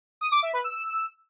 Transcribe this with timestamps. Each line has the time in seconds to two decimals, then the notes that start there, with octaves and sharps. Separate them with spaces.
0.21 D#6
0.32 D6
0.43 E5
0.53 B4
0.64 E6